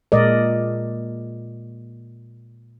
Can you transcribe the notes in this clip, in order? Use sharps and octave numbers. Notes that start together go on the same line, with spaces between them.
A#2 G#3 A#4 D5 D#5